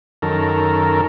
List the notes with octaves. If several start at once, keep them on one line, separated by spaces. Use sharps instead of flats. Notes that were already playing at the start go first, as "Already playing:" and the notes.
F#2 D#3 A4 A#4